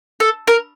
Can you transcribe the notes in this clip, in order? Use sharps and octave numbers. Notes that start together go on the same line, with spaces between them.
A4
A#4